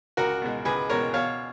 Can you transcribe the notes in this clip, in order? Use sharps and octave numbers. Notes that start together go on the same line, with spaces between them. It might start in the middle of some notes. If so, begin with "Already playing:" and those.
C#2 F#4 A#4
B2 G#3
C#2 G#4 B4
B2 G#3 A#4 C#5
B2 C#5 F5